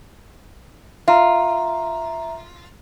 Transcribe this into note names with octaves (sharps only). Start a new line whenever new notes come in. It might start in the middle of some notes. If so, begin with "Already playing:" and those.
F4 E5 A#5